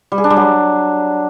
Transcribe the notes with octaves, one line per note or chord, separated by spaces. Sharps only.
G3
G#4
D4
G3
F#3